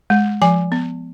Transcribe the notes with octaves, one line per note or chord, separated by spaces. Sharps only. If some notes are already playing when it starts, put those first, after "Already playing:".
G#3
F3 G#5
B3